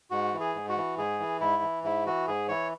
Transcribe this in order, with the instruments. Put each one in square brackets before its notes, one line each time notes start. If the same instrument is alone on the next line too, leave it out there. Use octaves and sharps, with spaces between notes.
[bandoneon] G#2 F#4
E3
G#4
G#2
F#4
E3
G#2 G#4
E3
G#2 E4
E3
G#2 E4
E3 F#4
G#2 G#4
E3 C#5